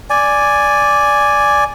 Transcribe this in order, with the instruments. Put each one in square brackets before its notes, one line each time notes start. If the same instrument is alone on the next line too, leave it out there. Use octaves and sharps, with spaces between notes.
[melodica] D5 G#5